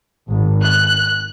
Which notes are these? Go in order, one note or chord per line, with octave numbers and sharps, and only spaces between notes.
G#1
F#6